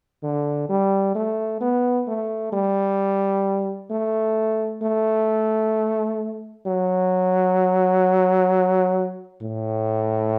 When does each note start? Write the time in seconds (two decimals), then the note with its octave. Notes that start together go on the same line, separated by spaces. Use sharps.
0.23 D3
0.69 G3
1.15 A3
1.61 B3
2.07 A3
2.52 G3
3.91 A3
4.82 A3
6.66 F#3
9.42 A2